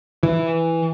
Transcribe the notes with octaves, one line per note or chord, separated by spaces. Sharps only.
E3